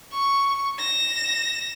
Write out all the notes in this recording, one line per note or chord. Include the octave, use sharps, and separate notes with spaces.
C#6
A#6 E7